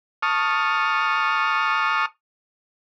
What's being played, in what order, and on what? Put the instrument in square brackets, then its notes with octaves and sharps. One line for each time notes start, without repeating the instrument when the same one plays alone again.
[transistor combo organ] A5 C#6 D#6 F6